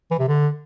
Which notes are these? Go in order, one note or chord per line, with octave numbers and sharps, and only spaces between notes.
E3
C3
D3